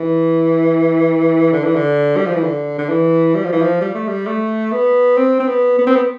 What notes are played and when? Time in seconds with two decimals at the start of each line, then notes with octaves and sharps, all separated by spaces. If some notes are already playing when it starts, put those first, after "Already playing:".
Already playing: E3
1.53 D3
1.64 E3
1.75 D3
2.17 G3
2.26 F3
2.35 E3
2.44 D3
2.78 D3
2.89 E3
3.35 G3
3.44 F3
3.53 E3
3.61 F3
3.81 G3
3.94 A3
4.08 G3
4.26 A3
4.72 B3
5.17 C4
5.40 C4
5.48 B3
5.79 B3
5.87 C4
5.96 B3